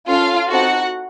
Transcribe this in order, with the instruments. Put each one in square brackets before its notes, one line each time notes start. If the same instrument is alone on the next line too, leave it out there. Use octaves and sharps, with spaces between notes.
[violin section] C#4 F4 A4 F5
C4 D#4 F#4 A4 F#5